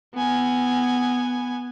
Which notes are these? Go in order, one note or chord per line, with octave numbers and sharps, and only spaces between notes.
B3 G#5